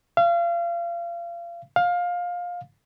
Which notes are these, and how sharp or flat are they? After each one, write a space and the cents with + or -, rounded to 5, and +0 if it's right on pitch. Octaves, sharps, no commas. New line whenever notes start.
F5 -30
F5 +20